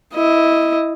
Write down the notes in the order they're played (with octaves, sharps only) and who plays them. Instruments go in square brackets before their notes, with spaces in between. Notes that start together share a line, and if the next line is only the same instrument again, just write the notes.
[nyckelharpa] E4 D#5